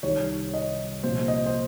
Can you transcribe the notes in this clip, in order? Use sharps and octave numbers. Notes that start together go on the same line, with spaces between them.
C2 C3 D#3 G3 C#5
D#5
C2 A#2 F3 C5
D#5
C5